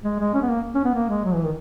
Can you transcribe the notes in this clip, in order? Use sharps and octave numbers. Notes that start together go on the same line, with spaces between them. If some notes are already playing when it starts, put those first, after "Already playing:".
G#3
G#3
C#4
B3
A#3
C#4
B3
A#3
G#3
F#3
E3
D#3